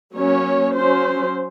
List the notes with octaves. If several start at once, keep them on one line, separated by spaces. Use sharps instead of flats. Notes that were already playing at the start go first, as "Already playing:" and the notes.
F#3 A#3 C#4 C#5
F#3 C#4 C5